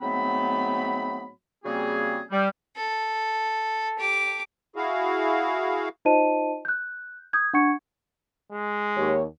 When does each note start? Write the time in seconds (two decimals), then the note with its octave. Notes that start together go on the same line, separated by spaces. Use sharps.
0.01 G#2 F#3 A3 B3 C4 B5
1.64 C#3 G3 A#3 C4 F#4 G#4
2.31 G3
2.77 A4
3.99 G4 D6
4.76 E4 F#4 G#4 F5
6.05 D#4 F4 C5 D#5 A5 D#7
6.65 F#6 G6
7.33 D#6 G6 G#6
7.53 D4 F#5 C#6 G#6 C#7
8.52 G#3
8.97 D#2 G4 C#5